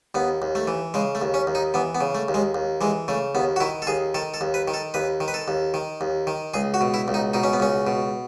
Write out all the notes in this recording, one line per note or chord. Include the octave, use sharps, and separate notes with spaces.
D#2 B3
D#2
A3
E3
C#3 G#3
A3
D#2
C#4
D#2
D#4
E3 B3
B3
C#3
A3
D#2
G#3
D#2
E3 G#3
C#3 A3
D#2 B3
F#4
D#3 E4
A4
D#2 G#4
D#3 A4
A4
D#2
B4
D#3
A4
D#2 B4
D#3
B4
A4
D#2
D#3
D#2
D#3
C#2 G#4
F#4
B2
E4
C#2
D#4
B2 D#4
C#4
B3
C#2 C#4
B2